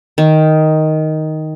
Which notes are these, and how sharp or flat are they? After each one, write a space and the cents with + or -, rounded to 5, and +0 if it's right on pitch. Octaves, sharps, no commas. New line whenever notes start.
D#3 +5